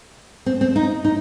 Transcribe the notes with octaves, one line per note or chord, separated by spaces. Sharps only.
C4
C4
D#4
D#4